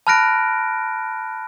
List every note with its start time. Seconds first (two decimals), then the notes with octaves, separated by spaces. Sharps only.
0.07 A5 B5 F6 F#6 A#6 D7